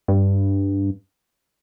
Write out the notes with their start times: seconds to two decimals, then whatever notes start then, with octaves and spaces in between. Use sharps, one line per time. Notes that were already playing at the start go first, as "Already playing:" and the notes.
0.08 G2